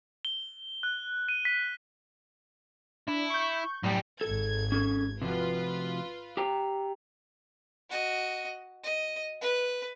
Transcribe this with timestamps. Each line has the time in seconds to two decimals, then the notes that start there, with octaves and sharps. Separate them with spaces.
0.25 G7
0.83 F#6
1.29 D#7
1.45 B6
3.08 D4 E4
3.30 C#6 G6
3.83 F#2 A2 G3 G5
4.21 G#1 A4 G#6
4.72 C#4 G#4 A4
5.21 C3 F3 F4 F#4 B4
6.37 G4 G5 A#5
7.90 F#4 D#5
8.83 D#5
9.41 B4